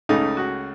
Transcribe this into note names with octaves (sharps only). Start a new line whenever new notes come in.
C#2 C#3 A3 D#4
F#4